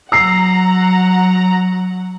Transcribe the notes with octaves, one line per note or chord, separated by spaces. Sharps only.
F#3 F#5 A#5 E6 C7